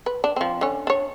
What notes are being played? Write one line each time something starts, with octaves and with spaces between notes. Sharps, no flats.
B4
D4
F3 C4
D3 C#4
D4 C#5